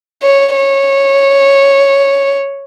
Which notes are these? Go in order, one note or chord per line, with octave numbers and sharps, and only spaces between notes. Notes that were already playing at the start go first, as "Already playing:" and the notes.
C#5
C#5